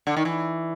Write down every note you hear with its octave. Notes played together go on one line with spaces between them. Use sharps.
D3
D#3
E3